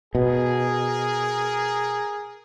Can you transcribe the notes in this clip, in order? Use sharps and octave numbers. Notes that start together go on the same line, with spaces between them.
B2 G#4 A#4